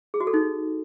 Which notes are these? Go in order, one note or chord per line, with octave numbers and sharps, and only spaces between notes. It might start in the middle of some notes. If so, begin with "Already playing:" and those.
G#4
F#4
A4
D#4